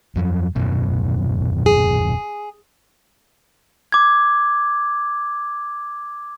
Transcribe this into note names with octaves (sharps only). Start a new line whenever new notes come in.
F2 F3 F#3
D#1 F#2 B2
G#4
D6 G#6